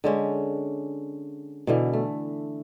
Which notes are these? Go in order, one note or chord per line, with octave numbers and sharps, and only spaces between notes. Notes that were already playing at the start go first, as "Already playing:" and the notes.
D3 G#3 C#4
B2 D3 E3
A3